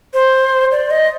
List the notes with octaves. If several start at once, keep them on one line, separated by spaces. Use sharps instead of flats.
C5
D5
D#5